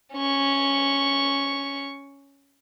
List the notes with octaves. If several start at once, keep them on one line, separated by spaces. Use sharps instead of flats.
C#4 C#6